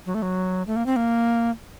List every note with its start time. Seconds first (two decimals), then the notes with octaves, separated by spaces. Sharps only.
0.06 F#3
0.15 A3
0.22 F#3
0.67 A3
0.76 A#3
0.86 C4
0.96 A#3